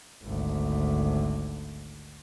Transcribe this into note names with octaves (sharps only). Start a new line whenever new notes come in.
G#1 D2